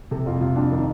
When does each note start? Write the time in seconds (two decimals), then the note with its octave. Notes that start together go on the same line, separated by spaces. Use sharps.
0.11 C3 A4
0.26 F2 F4
0.41 C3 F4
0.56 F2 D4
0.72 D#3